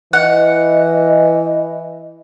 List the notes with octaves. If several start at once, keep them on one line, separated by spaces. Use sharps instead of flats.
E3 D#5 F#5